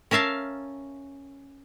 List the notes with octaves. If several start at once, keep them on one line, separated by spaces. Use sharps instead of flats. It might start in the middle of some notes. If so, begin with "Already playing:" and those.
C#4 A#4 E5 F5 A5